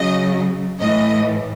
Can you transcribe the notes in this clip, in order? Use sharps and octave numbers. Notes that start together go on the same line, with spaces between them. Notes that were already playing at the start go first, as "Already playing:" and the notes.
Already playing: C#3 F#3 D#5
A2 E3 D#5